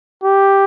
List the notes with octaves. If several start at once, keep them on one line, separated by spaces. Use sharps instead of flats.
G4